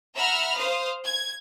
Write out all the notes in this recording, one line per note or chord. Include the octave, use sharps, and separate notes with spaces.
E5 F#5 A#5 B5 E6 F6
C5 F5 D#6
G#6